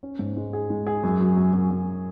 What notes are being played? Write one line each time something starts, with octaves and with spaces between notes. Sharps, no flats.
C#4
G#2
G#3
G#4
G#3
G#4
F#2
F#3
F#2
F#2
F#2